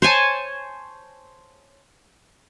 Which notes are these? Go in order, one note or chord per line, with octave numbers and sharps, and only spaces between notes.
C5 C#5 G#5 A5